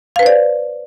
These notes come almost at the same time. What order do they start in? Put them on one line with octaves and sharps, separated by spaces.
F5 B4 C5 D5